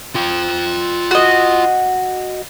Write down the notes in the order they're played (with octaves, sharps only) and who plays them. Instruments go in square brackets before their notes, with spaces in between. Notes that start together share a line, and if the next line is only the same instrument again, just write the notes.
[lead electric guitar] F4 G5
[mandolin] F#4 D#5